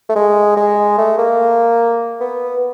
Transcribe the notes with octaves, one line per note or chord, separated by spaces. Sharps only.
A3
G#3
G#3
A3
A#3
B3